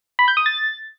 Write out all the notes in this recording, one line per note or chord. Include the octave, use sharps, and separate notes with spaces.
B5
G6
D#6
A6